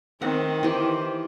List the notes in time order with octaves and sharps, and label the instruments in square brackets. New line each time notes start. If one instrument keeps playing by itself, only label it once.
[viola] D#3 [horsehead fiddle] C4 [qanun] F#5
[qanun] E3 G4 [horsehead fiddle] C5